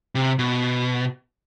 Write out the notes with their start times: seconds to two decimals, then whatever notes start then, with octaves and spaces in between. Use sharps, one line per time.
0.15 C3
0.39 B2